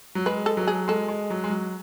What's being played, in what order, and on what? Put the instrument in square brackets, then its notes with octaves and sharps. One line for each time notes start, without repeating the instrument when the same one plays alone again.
[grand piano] F#3
[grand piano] G#3 [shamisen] B4
[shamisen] A4
[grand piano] F#3
[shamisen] G#4
[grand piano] G#3 [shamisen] A4
[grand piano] G#3
F#3
G#3
F#3